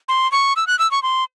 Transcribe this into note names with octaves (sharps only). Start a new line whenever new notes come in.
C6
C#6
E6
F#6
E6
C#6
C6